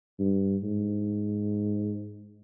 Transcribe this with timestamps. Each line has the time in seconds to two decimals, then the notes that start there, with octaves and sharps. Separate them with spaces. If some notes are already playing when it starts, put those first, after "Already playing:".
0.19 G2
0.63 G#2